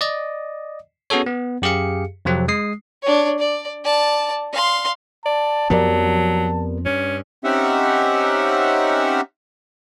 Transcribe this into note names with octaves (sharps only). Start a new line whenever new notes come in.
D5 D#5
B3 C#4 F#4 G#4 A4 C#5
B3
F#2 G4 G#4 F5 C#7
F2 C3 F#3 C4
G#3 D#6 C7
D4 C#5
D5
D5 A5
F5 C6
D5 A5
F2 F3 F#3 B3 G4 A#4 D5
G2 C#4
C4 C#4 D#4 G4 E5 F#5